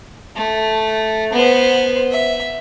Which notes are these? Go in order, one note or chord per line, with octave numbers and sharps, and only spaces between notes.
A3
B3 C5
E5